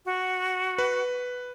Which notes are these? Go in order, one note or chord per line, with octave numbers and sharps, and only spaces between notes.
F#4
B4